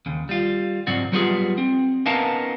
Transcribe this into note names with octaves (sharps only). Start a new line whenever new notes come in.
D#2 C#3
G3 F4
C#2 G#2 F#3 C4 F#4 D5
F#3 G3 B3 F4 F#4 G#4
C4
B3 C#4 D#4 A#4 F5 A5